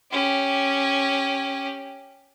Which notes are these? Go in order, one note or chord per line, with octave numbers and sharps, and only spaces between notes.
C#4 G4